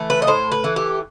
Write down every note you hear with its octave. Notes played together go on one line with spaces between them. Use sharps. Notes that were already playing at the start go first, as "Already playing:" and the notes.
Already playing: E3 A3
B4
D#5
A2 C5
B4
E3 A3
G4